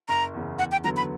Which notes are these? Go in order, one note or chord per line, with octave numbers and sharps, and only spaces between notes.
F#1 A#5
E2 C#3
E2 F#5
G5
D3 F#3 B3 A#5
B5